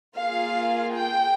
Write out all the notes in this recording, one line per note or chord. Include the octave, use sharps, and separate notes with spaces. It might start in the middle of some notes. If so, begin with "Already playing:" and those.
A#3 F4 G#4 F5
G5